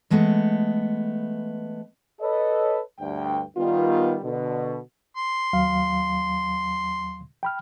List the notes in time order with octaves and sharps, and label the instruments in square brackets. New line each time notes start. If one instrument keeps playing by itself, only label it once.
[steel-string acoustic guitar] E3 G#3 A3 B3
[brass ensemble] A4 B4 C#5 D#5
D2 G2 G5
D#3 G3 B3 F4
B2 D3
[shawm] C6
[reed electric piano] D#2 F#3 F5
G5 B5 F6